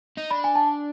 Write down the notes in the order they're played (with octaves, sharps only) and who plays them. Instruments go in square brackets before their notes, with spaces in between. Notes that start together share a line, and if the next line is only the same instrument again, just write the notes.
[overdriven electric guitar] D#4
[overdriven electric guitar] D4 [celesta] B5
[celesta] G#5
A5